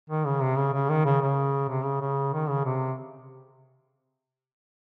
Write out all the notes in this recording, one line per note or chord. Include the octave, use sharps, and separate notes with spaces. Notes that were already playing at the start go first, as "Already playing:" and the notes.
D#3
C#3
C3
C#3
C#3
D#3
C#3
C#3
C3
C#3
C#3
D#3
C#3
C3